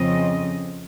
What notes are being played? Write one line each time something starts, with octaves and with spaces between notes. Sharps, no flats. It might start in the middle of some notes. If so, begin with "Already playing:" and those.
Already playing: F2 C#3 F3 C4 D#5